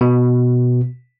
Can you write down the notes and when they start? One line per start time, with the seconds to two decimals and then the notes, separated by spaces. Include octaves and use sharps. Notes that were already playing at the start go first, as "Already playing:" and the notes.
0.01 B2